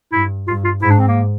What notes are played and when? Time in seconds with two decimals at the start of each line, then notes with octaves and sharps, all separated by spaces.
0.13 G2 E4
0.48 G2 F4
0.65 F4
0.81 G#2 E4
0.90 D4
0.99 C4
1.08 A#3